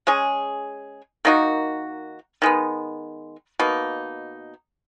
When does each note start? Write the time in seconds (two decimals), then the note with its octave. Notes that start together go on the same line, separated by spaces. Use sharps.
0.07 G#3 C#4 G#4
1.25 D#3 A#3 D#4 F#4
2.42 D#3 G#3 B3
3.59 B2 A#3 D#4